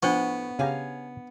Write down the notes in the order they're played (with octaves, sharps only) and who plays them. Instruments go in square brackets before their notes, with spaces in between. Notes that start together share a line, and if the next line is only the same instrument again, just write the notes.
[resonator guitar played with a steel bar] A2 F#5 [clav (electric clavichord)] F3 [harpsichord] B3 [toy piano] D4 C5 C#6
[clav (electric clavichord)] C#3 G4 A#5 [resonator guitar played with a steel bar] C#5 F5 G#5